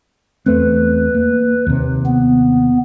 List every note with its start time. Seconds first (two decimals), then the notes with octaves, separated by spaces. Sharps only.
0.46 E2 A3 C4 B4
1.15 A#3
1.67 D#2 C3
2.06 B3